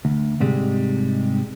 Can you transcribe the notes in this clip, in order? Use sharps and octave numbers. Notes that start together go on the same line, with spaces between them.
D2
G#2 C3 G3 G#3